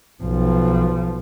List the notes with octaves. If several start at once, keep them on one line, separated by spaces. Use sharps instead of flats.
B1 F3